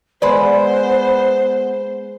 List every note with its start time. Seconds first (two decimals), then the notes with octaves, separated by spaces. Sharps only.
0.22 G#3 B3 B4 C5 D5 B5